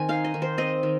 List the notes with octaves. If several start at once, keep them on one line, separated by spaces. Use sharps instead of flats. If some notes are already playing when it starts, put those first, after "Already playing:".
Already playing: D#3 C4 G#5
D#4 F5
D#5
D#3
C5
C4 D#5
D#3